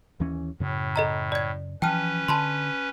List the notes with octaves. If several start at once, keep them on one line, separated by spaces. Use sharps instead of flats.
D#2 E3 C#4
F#2 A2 C#3
A4 D#5 A#5
D5 G#6
E3 F3 C#4 B4 G5 A5 F6
D3 A5 B5 C6